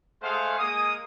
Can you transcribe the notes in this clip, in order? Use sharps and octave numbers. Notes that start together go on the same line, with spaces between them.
G#3 A3 G#4 C5 F5 F#5
G#3 A#3 D#6